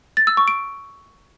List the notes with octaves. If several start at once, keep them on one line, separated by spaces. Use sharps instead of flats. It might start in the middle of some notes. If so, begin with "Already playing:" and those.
A6
E6
C#6
D7